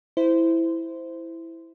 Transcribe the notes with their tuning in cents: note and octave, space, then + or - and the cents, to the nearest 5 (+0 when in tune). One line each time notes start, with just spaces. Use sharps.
E4 +0 C5 -15